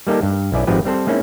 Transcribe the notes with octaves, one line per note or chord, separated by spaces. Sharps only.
G3 A#3 D#4 G4 A4
G2
B1 B3 C#4 E4 D5 G#5
G#1 D#3 F3 C4 G4 B4
G3 C4 A4 C5
G#3 A#3 C4 C#4 D#4 E4